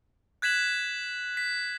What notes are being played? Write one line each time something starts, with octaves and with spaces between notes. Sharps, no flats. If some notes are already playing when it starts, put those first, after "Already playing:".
F#6 G#6 B6 E7 F#7
B6